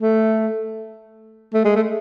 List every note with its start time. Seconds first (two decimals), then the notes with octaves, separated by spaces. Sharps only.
0.01 A3
1.54 A3
1.65 G#3
1.76 A3